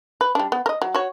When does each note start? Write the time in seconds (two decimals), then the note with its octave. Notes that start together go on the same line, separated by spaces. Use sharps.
0.21 B4
0.35 G3 D4
0.52 B3
0.66 A#4 D#5
0.82 F#3
0.95 F#4 C#5